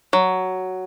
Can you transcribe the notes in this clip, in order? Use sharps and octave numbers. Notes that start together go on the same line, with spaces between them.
F#3